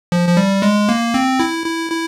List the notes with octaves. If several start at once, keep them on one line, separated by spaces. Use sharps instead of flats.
F3
F3
G3
G#3
A#3
C4
E4
E4
E4